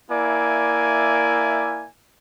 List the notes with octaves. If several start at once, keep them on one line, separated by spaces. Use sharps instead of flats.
A#3 E4 D5 E5 G#5